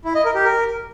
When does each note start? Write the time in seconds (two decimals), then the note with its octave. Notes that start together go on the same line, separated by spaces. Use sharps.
0.05 E4
0.15 D#5
0.25 A#4
0.35 G4
0.45 A#4